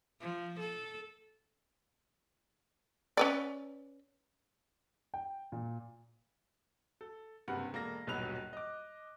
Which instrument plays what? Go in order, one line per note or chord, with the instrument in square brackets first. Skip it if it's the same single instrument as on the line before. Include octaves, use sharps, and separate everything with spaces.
[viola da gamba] F3
A4
[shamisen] C#4 B4 D5
[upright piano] G5
A#2
A4
F#1 G2 C3 F#5
E1 A#3 A4 A#6
D#1 B1 G2 F#3 F#6 F7
D#5 D6